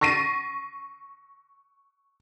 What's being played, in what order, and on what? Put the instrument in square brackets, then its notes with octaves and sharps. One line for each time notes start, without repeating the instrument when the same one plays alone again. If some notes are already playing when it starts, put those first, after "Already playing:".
[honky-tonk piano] C#6 A6 A#6 C7 D#7